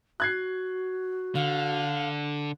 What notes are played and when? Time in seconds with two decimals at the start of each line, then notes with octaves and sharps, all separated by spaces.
0.20 F#4 F#6 G#6 C7
1.35 D3 F5